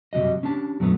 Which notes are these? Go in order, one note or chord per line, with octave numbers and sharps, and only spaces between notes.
F#2 C3 G3 F#4 D#5
C#4 D4 G4 A5
F#2 B2 F#3 A3 B3